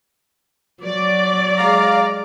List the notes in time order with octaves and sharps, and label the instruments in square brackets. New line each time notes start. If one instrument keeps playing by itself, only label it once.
[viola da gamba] F#3 [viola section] D5
[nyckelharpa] G#3 D6 [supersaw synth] F5 A#5